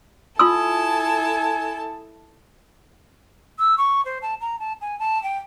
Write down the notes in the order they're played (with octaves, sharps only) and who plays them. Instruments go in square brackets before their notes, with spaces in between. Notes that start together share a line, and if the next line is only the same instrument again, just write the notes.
[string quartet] E4 A4 A5 [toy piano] F4 C6 E6 [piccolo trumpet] G#5 [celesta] D#6
[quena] E6
C#6
C5
A5
A#5
A5
G#5
A5
G5